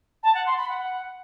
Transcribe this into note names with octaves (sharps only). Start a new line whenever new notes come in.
A5
F#5
C6
B5
F#5